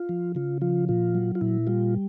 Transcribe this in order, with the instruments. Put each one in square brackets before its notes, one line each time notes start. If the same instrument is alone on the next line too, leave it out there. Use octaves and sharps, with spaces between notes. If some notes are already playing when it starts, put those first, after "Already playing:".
Already playing: [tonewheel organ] F4
F3
C#3 F4
F3 F4
A#2 F4
F#3
F4
A#2 E4
G3 F4